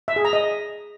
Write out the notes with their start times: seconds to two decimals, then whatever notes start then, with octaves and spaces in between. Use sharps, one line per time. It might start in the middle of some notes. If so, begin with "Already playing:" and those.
0.08 E5
0.16 G#4
0.25 A#5
0.33 D#5